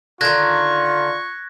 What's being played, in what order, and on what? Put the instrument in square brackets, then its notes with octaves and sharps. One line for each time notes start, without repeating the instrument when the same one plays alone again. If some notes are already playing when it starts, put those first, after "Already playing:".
[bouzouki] D3 D#3 [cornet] F4 [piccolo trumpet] C#6 [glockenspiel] F#6 G#6 A#6